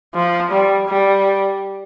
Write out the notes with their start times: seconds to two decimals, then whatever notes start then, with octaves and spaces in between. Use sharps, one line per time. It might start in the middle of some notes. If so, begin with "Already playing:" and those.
0.14 F3
0.51 G3
0.88 G3